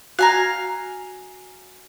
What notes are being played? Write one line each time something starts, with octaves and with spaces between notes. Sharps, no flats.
F#4 F5 G#5 A#5